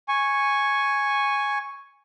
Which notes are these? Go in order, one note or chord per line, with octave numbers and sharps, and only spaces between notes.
G#5 C#6